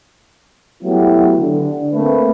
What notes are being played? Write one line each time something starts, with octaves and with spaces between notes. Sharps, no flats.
F#3 A3 B3 E4 G4
D3
A3 A#3 C4 B4